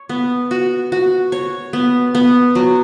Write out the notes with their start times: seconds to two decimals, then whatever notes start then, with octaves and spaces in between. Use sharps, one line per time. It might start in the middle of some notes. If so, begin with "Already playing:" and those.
Already playing: C#5
0.09 B3
0.51 F#4
0.92 F#4
1.32 C#5
1.73 B3
2.15 B3
2.55 F#3